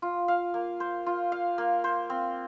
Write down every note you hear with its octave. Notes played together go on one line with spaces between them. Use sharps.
F4
F5
A#3
C5
F4
F5
A#3
C5
C4